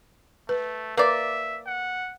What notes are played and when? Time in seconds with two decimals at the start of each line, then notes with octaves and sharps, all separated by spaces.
0.49 A3 B4
0.97 A#3 B4 D5 E5
1.67 F#5